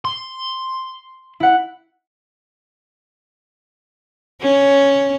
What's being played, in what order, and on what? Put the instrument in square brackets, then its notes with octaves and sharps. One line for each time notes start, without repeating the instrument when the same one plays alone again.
[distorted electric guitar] C6
[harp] E4 F#5
[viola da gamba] C#4